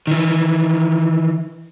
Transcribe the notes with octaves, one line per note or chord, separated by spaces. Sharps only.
D#3 E3